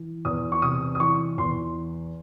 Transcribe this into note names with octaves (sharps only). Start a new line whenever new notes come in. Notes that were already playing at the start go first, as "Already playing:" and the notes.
Already playing: E3
E2 D#6
C#6
C3 D#6
D#6
E3 C#6
E2 C6